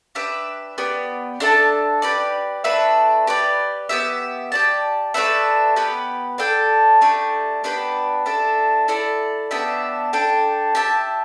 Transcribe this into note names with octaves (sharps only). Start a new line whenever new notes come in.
D4 G4 B4 E5
B3 G4 D5
D4 A4 E5 A5
G4 B4 D5
A3 D4 B4 E5
G4 B4 D5
B3 G4 E5
G4 D5 A5
A3 D4 B4 E5
B3 G4 B4
D4 A4 G5
A3 D4 G4
B3 D4 G4 B4
D4 A4 E5
E4 A4 D5
B3 D4 G4 E5
D4 A4 G5
G4 E5 A5